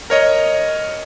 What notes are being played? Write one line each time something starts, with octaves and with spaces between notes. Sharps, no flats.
A#4 C#5 D#5